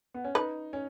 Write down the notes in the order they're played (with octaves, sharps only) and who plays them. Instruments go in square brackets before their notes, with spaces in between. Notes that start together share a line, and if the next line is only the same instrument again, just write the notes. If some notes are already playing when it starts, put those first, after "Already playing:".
[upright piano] B3
C#4
[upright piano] D#4 [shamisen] B4
[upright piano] C#4